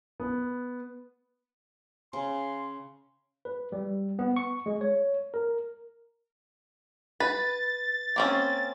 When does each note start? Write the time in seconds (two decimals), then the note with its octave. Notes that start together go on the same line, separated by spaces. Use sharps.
0.20 B3
2.13 C#3 C6
3.45 B4
3.72 G3
4.19 B3
4.36 C#6
4.66 G#3
4.81 C#5
5.34 A#4
7.20 B4 A6
8.16 A#3 C4 C#4